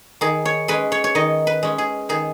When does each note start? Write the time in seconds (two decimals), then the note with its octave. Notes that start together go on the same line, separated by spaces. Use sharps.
0.21 D#3 G#4
0.45 C#5
0.68 G#3 C#4 B4
0.92 C#5
1.04 C#5
1.15 D#3 D#5
1.47 B4
1.63 G#3 C#4
1.78 G#4
2.09 D#3 G#4